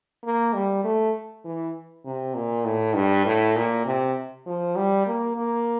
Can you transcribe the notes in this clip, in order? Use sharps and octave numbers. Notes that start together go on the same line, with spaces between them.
A#3
G3
A3
E3
C3
A#2
A2
G2
A2
A#2
C3
F3
G3
A#3
A#3